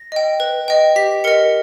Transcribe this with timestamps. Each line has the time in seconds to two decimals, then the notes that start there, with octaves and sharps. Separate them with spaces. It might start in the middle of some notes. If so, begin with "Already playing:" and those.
Already playing: A#6
0.12 D#5 G5
0.40 B4
0.68 D#5 G5
0.96 G4 B6
1.24 A#4 D#5 C#7